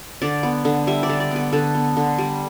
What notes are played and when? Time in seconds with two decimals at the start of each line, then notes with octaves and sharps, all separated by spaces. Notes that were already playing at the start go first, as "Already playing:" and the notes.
0.22 D3 D5
0.43 B3
0.65 D3
0.87 G3 E5
1.03 D5
1.09 D3
1.20 D5
1.31 B3 B4
1.53 D3 A4
1.75 B3
1.97 D3
2.18 G3